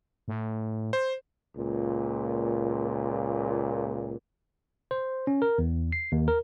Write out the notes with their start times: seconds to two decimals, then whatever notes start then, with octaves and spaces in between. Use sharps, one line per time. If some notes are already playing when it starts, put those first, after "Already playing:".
0.28 A2
0.93 C5
1.57 C#2 A#2
4.91 C5
5.27 C#4
5.42 A#4
5.58 E2
5.92 C7
6.12 D#2
6.28 A#4